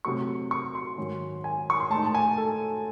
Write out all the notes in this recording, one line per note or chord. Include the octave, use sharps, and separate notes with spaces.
C3 F#3 A3 C#6
C#6
C6
G#2 D#3 F#3 C#4
G#5
C#6
C6
A2 G#3 D#4 A5
A5
G#5
A4